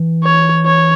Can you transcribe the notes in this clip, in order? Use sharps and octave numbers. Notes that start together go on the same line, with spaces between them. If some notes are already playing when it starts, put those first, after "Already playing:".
Already playing: E3
C#5
C#5